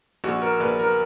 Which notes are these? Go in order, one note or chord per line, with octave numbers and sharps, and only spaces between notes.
A#1 F#4
A#4
A#1 B4
A#4